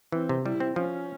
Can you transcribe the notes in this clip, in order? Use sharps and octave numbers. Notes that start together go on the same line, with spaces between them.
E3 C4
C3
G3 E4
C4
F3 C#4